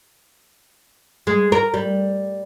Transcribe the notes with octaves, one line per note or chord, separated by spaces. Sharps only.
G#3
A#4
G3